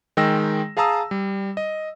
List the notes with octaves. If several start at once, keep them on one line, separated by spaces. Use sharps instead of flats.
D#3 G#3 G5 E6 A#6
G#4 F5 A5 A#5 D#6 E6
G3
D#5